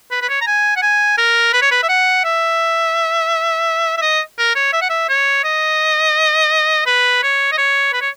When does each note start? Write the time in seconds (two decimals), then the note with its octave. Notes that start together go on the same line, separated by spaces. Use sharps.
0.11 B4
0.22 B4
0.29 C#5
0.41 A#5
0.47 G#5
0.76 F#5
0.82 G#5
1.18 A#4
1.53 B4
1.62 C#5
1.71 B4
1.83 E5
1.89 F#5
2.24 E5
3.98 E5
4.02 D#5
4.38 A#4
4.55 C#5
4.73 E5
4.81 F#5
4.90 E5
5.09 C#5
5.44 D#5
6.86 B4
7.23 C#5
7.52 D#5
7.58 C#5
7.93 B4
8.01 C#5